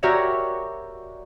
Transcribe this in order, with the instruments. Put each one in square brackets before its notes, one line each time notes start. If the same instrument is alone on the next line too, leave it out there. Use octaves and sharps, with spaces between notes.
[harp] F#4 G4 A#4 C#5 D5 E5